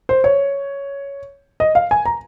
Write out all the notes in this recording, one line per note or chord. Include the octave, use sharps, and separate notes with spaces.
C5
C#5
D#5
F5
G#5
A#5